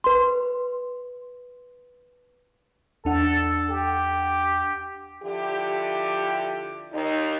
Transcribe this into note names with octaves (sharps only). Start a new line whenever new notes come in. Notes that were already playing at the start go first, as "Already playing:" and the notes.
B4 C6
E2 D4 A4 F#5
G4
D3 F3 E4 G4
D#2 D#4